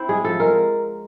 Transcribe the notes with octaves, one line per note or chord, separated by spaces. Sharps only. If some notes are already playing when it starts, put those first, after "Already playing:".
Already playing: C4 E4 C5
G#3 G#4
F3 A4
G#3 A#4